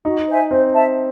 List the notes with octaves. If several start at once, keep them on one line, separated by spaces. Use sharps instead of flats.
D#4 F#4
C5 E5 G#5
C4 C5
E5 A5